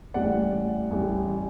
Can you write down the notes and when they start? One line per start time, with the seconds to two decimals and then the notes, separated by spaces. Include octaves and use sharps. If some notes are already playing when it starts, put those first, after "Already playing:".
0.14 A1 A2 G3 D5 F#5
0.91 A1 A2 G3